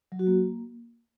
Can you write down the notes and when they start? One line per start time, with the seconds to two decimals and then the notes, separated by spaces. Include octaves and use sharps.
0.12 F#3
0.19 F#4
0.27 A#3